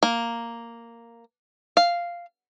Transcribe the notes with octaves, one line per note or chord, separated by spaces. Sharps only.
A#3
F5